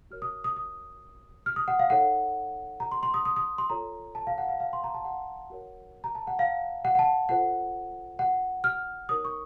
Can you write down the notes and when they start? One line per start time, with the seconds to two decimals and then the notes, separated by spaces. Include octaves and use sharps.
0.11 F#4 A#4 C#5 F6
0.22 D#6
0.44 D#6
0.56 D#6
1.46 F6
1.56 D#6
1.68 F#5
1.79 F5
1.90 D#4 A4 C#5 F#5
2.80 A#5
2.92 C6
3.03 C6
3.14 D#6
3.25 D#6
3.36 D#6
3.58 C6
3.70 F4 A4 C#5 A#5
4.15 A5
4.27 F5
4.38 F#5
4.48 F5
4.60 F5
4.73 C6
4.84 A#5
4.94 A5
5.05 F#5
5.50 F#4 A#4 C#5
6.04 A#5
6.15 A5
6.27 F#5
6.39 F5
6.85 F#5
6.95 F#5
6.99 A5
7.29 F4 A4 C5 F#5
8.19 F#5
8.64 F6
9.09 D#4 A#4 C#5 D#6
9.25 C#6